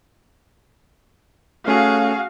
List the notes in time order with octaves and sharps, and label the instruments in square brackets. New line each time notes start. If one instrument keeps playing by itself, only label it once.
[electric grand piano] A3 C#4 [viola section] F#4 F5 [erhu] G#4